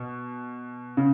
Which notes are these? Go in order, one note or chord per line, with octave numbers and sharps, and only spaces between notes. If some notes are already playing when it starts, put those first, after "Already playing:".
Already playing: B2
C#3